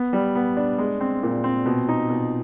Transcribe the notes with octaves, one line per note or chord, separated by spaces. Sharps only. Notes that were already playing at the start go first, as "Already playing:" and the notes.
Already playing: B3
G3
B3
D4
G#3
C4
A#2
C4
B2
D#4
B2